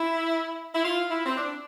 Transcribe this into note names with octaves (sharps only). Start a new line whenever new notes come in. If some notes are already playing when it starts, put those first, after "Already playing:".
Already playing: E4
E4
F4
E4
C4
D4